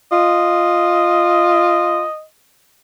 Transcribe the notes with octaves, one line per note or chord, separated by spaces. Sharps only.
F4 D#5